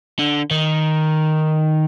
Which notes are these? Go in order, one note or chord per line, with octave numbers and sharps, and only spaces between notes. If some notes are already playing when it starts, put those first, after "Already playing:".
D3
D#3